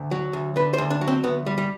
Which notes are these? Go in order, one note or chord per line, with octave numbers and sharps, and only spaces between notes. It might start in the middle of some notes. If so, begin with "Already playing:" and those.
Already playing: D2
F#3
D2
D3 B4
C5
D2
D4
F#3
C4
D2 B3
G3
G3